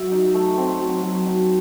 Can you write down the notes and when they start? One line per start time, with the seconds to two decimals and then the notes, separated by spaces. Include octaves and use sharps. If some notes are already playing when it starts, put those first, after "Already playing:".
Already playing: F#3 E5
0.12 D#4
0.34 A3
0.57 C4
0.80 F#3
1.03 F#3
1.26 D#4